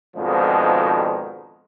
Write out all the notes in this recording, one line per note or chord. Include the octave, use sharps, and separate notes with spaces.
F2 G#2 B2 D3 D#3 F3